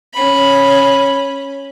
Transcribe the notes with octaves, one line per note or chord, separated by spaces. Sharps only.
C#4 B5